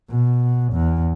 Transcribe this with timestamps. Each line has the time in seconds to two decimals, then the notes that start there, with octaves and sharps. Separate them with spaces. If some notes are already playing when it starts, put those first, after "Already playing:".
0.10 B2
0.73 E2